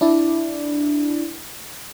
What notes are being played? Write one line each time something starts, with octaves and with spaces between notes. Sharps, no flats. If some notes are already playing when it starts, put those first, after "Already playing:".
D4 E4 D5